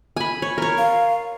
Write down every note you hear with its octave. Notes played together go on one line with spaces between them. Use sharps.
G#5 B5
C#5
A#4 C#5
F5